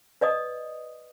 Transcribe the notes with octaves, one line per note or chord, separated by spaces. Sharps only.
B4 D5 D#5 D#6